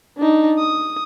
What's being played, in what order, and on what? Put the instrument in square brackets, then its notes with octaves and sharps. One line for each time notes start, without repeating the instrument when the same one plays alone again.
[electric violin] D4 D#4
D#6